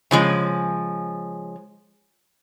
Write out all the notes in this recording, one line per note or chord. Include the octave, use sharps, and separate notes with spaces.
C#3 F3 G#3